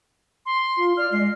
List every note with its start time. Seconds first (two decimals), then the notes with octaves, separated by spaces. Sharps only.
0.46 C6
0.78 F4
0.97 D5 F6
1.13 G#3 D#5 C7